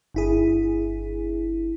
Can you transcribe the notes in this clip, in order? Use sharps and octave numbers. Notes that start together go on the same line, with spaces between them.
G1 E4 G#4